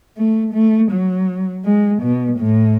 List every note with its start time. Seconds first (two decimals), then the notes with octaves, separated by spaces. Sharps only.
0.17 A3
0.54 A3
0.91 F#3
1.65 G#3
2.02 B2
2.39 A2